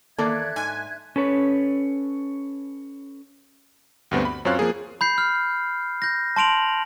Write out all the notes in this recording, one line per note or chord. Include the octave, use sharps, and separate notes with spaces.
E2 D#3 A#3 A4 D5 E5 F#6 G#6
G#2 G#5
C#4 A4 B4 C#5
D2 G2 B3 C4
B5
F#2 C4 F4 C#5 F5 F#6
F3 A#3 G#4
B5 G6 C7
F6
G6 A#6
A5 C6 D7 F7 F#7